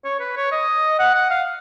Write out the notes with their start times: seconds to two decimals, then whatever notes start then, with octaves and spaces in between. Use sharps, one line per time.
0.04 C#5
0.20 B4
0.36 C#5
0.52 D#5
0.99 F#5
1.15 F#5
1.30 F5